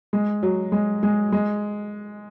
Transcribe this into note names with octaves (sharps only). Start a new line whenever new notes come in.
G#3
F#3
G#3
G#3
G#3